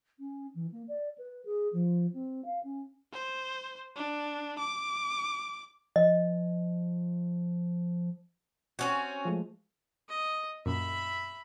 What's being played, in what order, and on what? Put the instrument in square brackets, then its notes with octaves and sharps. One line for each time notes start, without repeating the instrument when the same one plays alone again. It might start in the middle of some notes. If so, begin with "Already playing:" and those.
[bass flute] C#4
E3
A#3
D5
B4
G#4
F3
C4
F5
C#4
[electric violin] C5
D4
D6
[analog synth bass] F3 [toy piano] D#5
[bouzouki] C4 C#4 F#4
[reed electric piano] F3 G#3 A3
[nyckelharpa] D#5
[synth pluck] F#2 A#2 [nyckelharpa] E5 B5